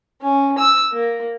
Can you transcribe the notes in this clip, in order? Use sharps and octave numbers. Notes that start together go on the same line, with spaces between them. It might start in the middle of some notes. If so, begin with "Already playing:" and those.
C#4
E6
A#3